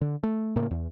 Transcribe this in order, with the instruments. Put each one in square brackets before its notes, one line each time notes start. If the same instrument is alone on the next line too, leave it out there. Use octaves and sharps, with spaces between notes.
[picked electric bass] D3
A3
A2 C#3 A#3
E2